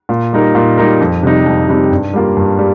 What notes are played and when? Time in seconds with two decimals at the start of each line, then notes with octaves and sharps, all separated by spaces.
0.09 A#2
0.33 G3 D#4 A#4
0.55 A#2
0.77 G3 D#4 A#4
1.01 F2
1.23 C3 G3 D#4
1.46 F2
1.69 C3 G3 D#4
1.92 G2
2.14 G3 A#3 F4
2.37 G2
2.59 G3